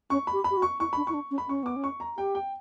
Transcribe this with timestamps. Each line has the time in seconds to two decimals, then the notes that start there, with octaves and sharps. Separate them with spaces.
0.10 C#4 C#6
0.27 B5
0.33 G4
0.44 B5
0.51 G4
0.57 F#4
0.62 C#6
0.80 E4 C#6
0.93 D4 B5
1.07 E4 C#6
1.14 D4
1.31 C#4
1.38 B5
1.48 C#4 C#6
1.63 B3 D6
1.76 C#4
1.84 C#6
2.00 A#5
2.18 G4 G5
2.35 G5